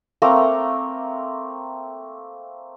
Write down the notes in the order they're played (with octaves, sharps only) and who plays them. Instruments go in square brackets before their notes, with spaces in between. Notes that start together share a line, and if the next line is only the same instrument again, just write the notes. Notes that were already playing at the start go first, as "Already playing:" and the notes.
[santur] A3 A#3 C4 A#5